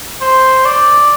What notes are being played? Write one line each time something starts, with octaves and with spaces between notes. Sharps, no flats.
C5
D5